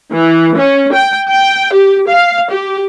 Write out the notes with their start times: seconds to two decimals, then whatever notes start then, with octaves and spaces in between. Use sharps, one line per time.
0.13 E3
0.57 C#4
0.94 G5
1.31 G5
1.73 G4
2.08 F5
2.51 G4